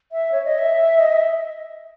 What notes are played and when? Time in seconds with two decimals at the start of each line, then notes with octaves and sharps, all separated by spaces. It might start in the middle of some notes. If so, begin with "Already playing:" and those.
0.12 E5
0.32 C#5
0.45 D#5
0.59 E5
1.00 D#5
1.12 E5